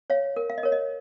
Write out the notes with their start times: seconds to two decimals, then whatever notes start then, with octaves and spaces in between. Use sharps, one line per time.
0.10 C#5 F5
0.36 A#4
0.50 F5
0.58 D#5
0.63 A#4 C#5
0.72 D#5